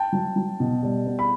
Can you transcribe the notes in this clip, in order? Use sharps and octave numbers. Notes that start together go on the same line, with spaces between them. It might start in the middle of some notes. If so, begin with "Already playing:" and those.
Already playing: G5 A5
F#3
F#3
B2
G3
B3
B5